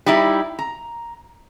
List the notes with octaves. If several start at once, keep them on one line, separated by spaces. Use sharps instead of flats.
G3 D#4 E4
A#5